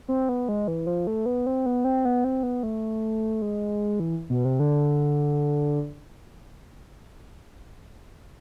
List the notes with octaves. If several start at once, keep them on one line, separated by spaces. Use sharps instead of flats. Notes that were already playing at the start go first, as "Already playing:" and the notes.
C4
B3
G#3
E3
F3
A3
B3
C4
B3
C4
B3
C4
B3
A3
G#3
E3
B2
C3
D3